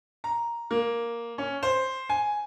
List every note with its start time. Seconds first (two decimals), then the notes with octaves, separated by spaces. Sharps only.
0.24 A#5
0.71 A#3
1.38 C#4
1.63 C5
2.09 G#5